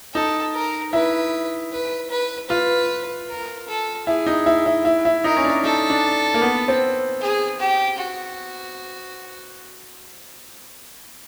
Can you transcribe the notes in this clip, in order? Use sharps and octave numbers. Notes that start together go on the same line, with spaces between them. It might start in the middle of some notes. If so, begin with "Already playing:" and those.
D#4 A4
A#4
E4 B4
B4
B4
F4 B4
A#4
A4
E4 G#4
D#4
E4
E4
E4
E4
D#4 A#4
C#4
D4
D#4 A4
D4
A#3
B3
C4
G#4
G4
F#4